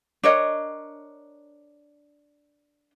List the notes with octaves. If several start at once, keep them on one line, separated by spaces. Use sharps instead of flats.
D4 A#4 C#5 D#5